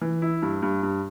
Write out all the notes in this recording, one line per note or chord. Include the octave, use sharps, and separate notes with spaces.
E3
E4
G2
G2
G2